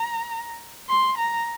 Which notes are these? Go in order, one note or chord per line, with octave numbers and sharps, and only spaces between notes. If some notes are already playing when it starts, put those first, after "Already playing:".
Already playing: A#5
C6
A#5